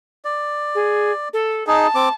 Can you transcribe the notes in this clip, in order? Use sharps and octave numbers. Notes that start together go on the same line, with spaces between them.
D5
G#4
A4
D#4 G#4 A5
C4 D6